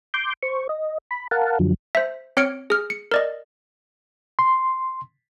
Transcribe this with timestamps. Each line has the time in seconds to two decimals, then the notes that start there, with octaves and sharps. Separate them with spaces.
0.14 C6 D6 G6
0.43 C5 C#6
0.69 D#5
1.11 B5
1.31 A#4 F5 F#5 A5
1.59 F#2 D3 F3 F#3
1.95 C5 E5
2.37 C4 C#5 F6 C#7 D7
2.70 G#4 F6
2.90 C#7
3.12 A#4 D5 D#5
4.39 C6